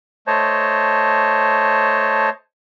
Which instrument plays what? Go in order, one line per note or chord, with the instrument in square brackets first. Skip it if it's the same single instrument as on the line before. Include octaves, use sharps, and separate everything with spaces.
[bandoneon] A3 C5 C#5 D#5 A5